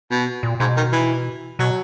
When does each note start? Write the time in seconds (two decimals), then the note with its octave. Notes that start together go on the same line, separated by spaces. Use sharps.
0.10 B2
0.43 A#2
0.60 G#2 B2
0.77 D#3
0.92 E3
1.59 B2 F#3